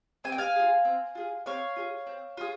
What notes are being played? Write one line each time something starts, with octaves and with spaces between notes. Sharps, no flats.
C4 G#5
G5
F5 G#5
F4 G#4
C4
F4 G#4
C4 C#5 F5
F4 G#4
C4
F4 G#4